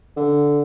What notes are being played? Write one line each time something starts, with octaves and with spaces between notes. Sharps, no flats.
D3